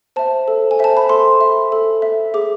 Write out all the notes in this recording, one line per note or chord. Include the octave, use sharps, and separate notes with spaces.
C5 E5 A5
A4
G#5
C5 E5 A5
B5
A4 C6
E5
A4
E5
G#4 D6